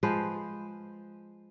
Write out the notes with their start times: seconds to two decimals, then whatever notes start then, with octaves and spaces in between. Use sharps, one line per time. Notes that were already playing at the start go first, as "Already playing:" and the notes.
0.03 F3 G#3 B4 C5